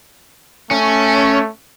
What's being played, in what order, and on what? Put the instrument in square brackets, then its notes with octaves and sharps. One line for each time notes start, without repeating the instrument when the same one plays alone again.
[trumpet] A3 [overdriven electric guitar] C#4